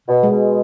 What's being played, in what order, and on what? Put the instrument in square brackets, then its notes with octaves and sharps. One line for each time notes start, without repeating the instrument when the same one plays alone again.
[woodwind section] B2
[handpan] G#3
[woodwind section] B2